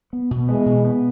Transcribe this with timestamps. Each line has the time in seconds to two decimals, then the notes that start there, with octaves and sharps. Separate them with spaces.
0.13 B3
0.31 B2
0.49 E3 G#3 B3
0.66 B2
0.84 B3